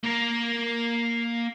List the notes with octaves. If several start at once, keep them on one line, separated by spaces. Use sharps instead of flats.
A#3 A#4